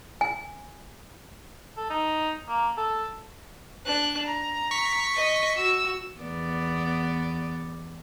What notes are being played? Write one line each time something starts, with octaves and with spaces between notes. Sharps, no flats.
G#5
A4
D#4
A#3
A4
D4 F#6
A#5
C#6 B6
D#5
F#4 E6
E2 B3 D5